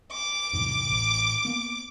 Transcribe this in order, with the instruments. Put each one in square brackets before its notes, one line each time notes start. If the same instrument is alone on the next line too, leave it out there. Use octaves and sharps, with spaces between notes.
[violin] D6
[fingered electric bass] E2 G#2 C3
A1
A#3 B3